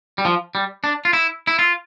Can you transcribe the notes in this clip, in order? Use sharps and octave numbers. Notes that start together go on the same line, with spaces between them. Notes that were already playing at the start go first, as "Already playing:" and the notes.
G3
F3
G3
D4
F4
E4
E4
F4